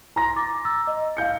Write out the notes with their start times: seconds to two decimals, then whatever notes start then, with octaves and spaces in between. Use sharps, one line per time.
0.16 A#5 C6 A#6
0.36 D6 A6
0.65 E6 A6
0.87 D#5
1.17 F5 G6 C#7